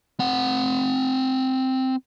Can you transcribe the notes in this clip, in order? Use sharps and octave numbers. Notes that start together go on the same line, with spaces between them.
C4 F#5